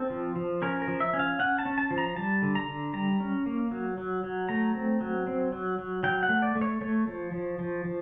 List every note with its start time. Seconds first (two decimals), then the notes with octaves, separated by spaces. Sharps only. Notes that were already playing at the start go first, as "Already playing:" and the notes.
Already playing: C4 A4
0.10 F3
0.36 F3
0.62 C#4 A#4
0.82 A#4
0.88 F3
1.00 E5
1.13 C#4
1.19 F5
1.39 C#4 F#5
1.59 A5
1.65 C#4
1.78 A5
1.91 F3
1.98 A#5
2.16 G3 A5
2.42 D3
2.55 A#5
2.69 D3
2.93 G3 A#5
3.20 C#4
3.46 A#3
3.71 F#3
3.98 F#3
4.24 F#3
4.49 A3 A#5
4.75 C4
5.01 F#3
5.27 C4
5.52 F#3
5.78 F#3
6.03 F#3 G5
6.23 F#5
6.29 A3
6.42 D5
6.55 A3
6.61 C#5
6.81 A3 C#5
7.07 F3
7.32 F3
7.59 F3
7.85 F3